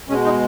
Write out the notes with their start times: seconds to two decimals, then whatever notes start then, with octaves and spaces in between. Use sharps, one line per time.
0.09 B2 G#3 C#4
0.25 D#4